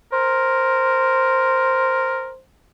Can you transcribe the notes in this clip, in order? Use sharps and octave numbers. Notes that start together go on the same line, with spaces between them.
A#4 C5